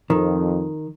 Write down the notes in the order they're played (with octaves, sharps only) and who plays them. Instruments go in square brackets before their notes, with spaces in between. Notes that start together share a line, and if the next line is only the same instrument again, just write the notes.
[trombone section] F2 [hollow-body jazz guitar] D#3